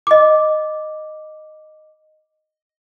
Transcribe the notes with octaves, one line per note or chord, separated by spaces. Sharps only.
D#5 D6